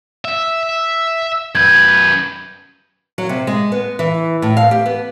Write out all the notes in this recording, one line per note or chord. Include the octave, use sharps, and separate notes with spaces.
E5
F#2 B4 G6 G#6
F#3
C3
G#3
B3
E3
A2
F5
G4
B3